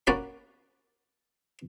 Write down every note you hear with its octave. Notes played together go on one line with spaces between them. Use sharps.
A#3 C#4 F#4 D5 B5